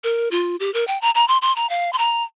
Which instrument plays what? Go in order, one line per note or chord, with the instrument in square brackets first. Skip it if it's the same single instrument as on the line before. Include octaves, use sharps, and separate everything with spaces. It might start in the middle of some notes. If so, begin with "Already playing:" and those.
[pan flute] A#4
F4
G4
A#4
G5
A#5
A#5
C6
C6
A#5
F5
C6
A#5